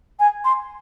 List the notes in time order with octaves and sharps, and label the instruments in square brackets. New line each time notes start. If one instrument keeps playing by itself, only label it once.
[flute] G#5
C6